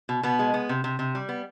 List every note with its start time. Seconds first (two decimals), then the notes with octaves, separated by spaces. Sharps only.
0.09 B2
0.23 B2 B3
0.39 G#3
0.54 B3
0.69 C3
0.84 C3
0.99 C3
1.15 G3
1.29 B3